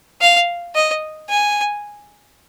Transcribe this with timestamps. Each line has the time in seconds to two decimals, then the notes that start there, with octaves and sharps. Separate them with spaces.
0.21 F5
0.75 D#5
1.29 G#5